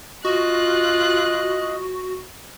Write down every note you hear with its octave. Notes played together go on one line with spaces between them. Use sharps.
F4 F#4 D#5 F#6